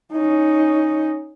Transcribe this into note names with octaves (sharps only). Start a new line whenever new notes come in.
C#4 D#4